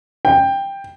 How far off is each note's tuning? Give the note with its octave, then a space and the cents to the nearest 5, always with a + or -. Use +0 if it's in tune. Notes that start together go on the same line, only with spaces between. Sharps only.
G5 +10